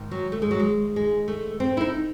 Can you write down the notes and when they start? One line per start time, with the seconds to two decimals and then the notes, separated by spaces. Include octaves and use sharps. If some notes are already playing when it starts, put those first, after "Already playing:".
Already playing: G#2 D#3
0.11 F#3
0.32 A3
0.42 G#3
0.51 F#3
0.60 G#3
0.96 G#3
1.28 A3
1.60 C4
1.77 E4
1.81 D#4